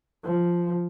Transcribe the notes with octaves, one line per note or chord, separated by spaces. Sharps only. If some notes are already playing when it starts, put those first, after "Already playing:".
F3